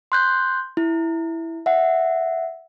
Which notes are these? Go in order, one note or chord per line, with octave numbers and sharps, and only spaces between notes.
C6 F#6 G6
E4
E5 F#5